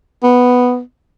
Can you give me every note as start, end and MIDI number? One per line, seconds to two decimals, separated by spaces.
0.23 0.80 59